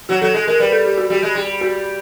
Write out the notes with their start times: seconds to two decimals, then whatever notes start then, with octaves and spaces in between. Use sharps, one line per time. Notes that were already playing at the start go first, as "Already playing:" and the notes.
0.09 F#3 F#4
0.21 F#3 A4
0.34 G#3 G#4
0.47 G#3 A#4
0.60 G3 B4
0.72 A4
0.86 G4
0.97 F#4
1.10 G3 F#4
1.23 G#3
1.35 G3
1.61 F#4